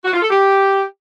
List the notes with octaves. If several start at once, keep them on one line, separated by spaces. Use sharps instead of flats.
F#4
F4
A4
G4